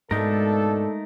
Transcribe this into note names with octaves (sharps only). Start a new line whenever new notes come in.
G#2 B2 G#3 A3 D4 D#4 A4 A#4